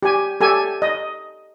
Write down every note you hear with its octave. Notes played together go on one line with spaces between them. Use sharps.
G4 G#5
G4 A4 G#5
D#5